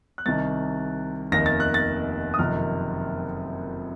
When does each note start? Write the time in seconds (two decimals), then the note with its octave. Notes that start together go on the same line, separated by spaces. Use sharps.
0.18 F#6
0.26 C2 C3 D#3 A6
1.32 F1 D#2 D#3 A#6
1.46 A6
1.60 F#6
1.74 A6
2.34 D#6
2.39 F#1 F2 C3 D#3 F6